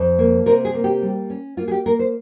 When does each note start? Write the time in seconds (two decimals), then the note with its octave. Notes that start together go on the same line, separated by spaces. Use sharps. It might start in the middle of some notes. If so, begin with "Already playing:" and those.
Already playing: F2
0.18 A#3
0.46 C3 A#4
0.65 G#4
0.74 A#3
0.84 G4
1.02 G3
1.30 C#4
1.57 A#3 F4
1.68 G#4
1.71 G4
1.86 A#3 A#4
1.99 C5